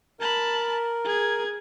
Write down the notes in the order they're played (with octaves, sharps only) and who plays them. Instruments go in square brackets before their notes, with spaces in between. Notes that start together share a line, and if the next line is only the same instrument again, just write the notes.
[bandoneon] A#4 [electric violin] A5 B5
[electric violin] G#4 G#6